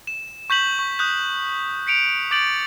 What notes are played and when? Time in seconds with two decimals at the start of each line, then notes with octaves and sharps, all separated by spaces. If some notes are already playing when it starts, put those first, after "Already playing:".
0.07 E7
0.50 C#6 G6 B6 F#7
0.79 C#6
0.99 D#6 F#6 G6
1.87 B6 C#7 D7 F7
2.31 D6 G6 A6 D7 F#7